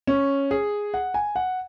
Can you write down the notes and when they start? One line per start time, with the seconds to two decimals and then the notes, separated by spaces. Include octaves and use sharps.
0.07 C#4
0.51 G#4
0.94 F#5
1.14 G#5
1.36 F#5